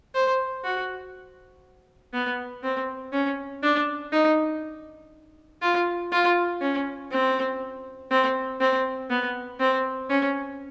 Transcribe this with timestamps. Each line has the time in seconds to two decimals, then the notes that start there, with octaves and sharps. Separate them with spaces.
0.14 C5
0.64 F#4
2.13 B3
2.63 C4
3.13 C#4
3.63 D4
4.12 D#4
5.62 F4
6.12 F4
6.61 C#4
7.11 C4
8.11 C4
8.60 C4
9.10 B3
9.60 C4
10.10 C#4